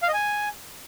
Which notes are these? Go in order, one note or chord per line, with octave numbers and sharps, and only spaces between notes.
F5
D#5
G#5